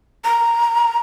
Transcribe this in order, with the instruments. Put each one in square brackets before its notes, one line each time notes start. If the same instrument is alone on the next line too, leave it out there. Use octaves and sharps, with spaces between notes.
[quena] A#5